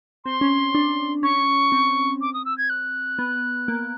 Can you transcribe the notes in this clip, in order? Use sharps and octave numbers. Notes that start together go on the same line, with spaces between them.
C4 C6
C#4
C#4
D4
C#4 C#6
C4
D6
D#6
E6
G#6
F#6
B3
A#3